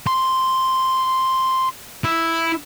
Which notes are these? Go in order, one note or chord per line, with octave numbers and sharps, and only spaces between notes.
C6
E4